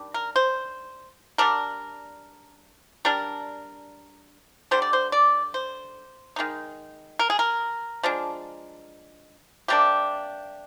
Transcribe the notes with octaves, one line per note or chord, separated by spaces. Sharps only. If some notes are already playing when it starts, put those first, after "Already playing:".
Already playing: D#3 G3 D4
A#4
C5
G3 D4 A#4
G3 D4 A#4
D3 G3 D4 C5
D5
C5
D5
C5
D#3 G#3 D#4
A#4
G#4
A#4
F3 G#3 D4
C3 G3 A#3 D4 G4